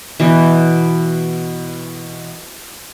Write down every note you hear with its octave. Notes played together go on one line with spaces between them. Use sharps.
B2 E3